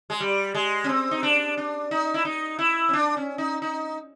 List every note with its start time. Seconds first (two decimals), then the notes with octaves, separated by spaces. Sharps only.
0.10 G#3
0.20 G3
0.54 G#3
0.84 C#4
0.89 C4
1.11 D#4
1.23 D4
1.57 D4
1.91 D#4
2.14 E4
2.25 D#4
2.59 E4
2.89 C#4
2.93 D4
3.17 C#4
3.38 D#4
3.62 D#4